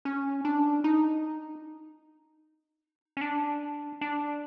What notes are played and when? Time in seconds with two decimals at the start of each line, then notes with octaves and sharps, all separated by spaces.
0.05 C#4
0.45 D4
0.84 D#4
3.17 C#4
3.21 D4
4.01 D4